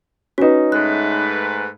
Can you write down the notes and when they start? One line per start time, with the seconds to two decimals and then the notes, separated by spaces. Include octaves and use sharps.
0.38 C#4 D#4 F#4 B4
0.72 G#2 A3 B4 F#6